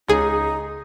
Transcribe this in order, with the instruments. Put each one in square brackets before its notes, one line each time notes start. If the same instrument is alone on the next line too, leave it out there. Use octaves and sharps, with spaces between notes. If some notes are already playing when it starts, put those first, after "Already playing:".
[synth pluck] C#2 G#4 [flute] D#4